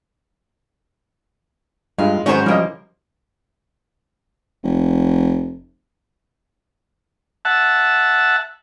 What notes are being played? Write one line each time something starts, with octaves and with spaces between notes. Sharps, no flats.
G2 G#3 F4
G#2 D#3 F#3 B3 C#4 C5 C#5
C3 F3 G3 A#3 D#5
F1
E5 F#5 A5